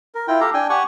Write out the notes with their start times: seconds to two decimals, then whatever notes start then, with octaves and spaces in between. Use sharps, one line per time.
0.15 A#4
0.28 E4 F4 G5
0.41 G4 A4 F5 A#5
0.54 D4 G5 G#5
0.70 G4 F#5 G#5 C#6